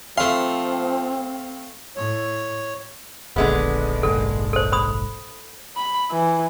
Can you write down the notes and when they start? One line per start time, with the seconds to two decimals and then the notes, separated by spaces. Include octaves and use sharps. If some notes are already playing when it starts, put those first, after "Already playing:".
0.17 F3 A3 C4 F5 C6
1.97 A2 C#5
3.36 D#1 A#1 D3 G#3 B3
4.03 F1 A#1 G#2 A4
4.53 A4 C5
4.72 C5 B5 D#6
5.76 B5
6.11 E3